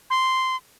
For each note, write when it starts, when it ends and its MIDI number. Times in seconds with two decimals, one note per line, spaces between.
0.10 0.56 84